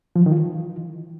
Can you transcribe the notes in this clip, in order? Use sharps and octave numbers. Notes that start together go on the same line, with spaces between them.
F3
F#3
D#3
F4
E3